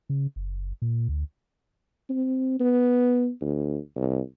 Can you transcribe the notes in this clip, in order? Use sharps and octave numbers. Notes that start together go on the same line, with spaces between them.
C#3
F#1
A#2
D2
C4
B3
D2
C2